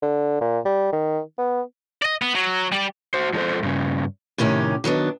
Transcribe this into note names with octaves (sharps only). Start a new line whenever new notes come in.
D3
A#2
G3
D#3
B3
D5 D#5
B3
F#3
G3 G4
F#4 C5
F3 G#3 D4 A4 C5
G2 C#3
A2 C3 D#3 C#4 G4
D#3 F#3 B3 D4